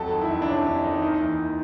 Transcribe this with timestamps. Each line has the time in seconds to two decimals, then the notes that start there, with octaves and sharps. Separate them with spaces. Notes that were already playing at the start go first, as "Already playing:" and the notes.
Already playing: F2 F#3 A4
0.12 D#3
0.22 E4
0.31 F2
0.42 D4
0.48 C3 C#4
0.66 F2
0.84 D#3 D#4
1.01 D#2 D#4
1.21 E3
1.39 D#2